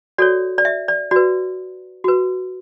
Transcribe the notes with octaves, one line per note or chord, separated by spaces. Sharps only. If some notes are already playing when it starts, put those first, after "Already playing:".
F#4 A4 C#5 D5
D5
E5
D5
F#4 B4 D5
F#4 B4